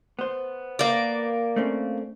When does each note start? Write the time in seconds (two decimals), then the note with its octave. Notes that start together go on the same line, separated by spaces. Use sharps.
0.19 B3 C5
0.79 A#3 D5
1.56 A3 C4 C#4